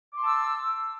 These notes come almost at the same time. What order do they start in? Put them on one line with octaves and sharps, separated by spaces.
D6 C6 A5 E6